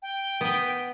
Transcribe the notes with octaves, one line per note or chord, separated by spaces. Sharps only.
G5
B3 B4